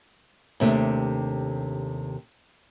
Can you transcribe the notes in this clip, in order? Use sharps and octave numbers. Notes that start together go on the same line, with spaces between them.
D#2 C3 A3 D4